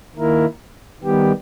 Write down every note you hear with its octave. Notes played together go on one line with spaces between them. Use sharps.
D#3 A#3 E4 A#4
D#3 G3 B3 G4